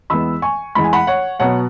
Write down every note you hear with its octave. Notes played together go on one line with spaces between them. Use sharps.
E2 E3 G#3 B3 B5 E6
G#5 C#6
E2 E3 G#3 B5
G#5
F#5 B5
C#5 F#5
B2 F#3 B3 C#5 F#5